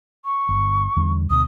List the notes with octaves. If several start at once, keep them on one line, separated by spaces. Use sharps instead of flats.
C#6
G1
E2 D3 G3
D2 B2 D#6